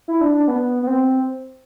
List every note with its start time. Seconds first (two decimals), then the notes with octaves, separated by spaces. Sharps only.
0.08 E4
0.21 D4
0.35 D4
0.48 B3
0.83 B3
0.87 C4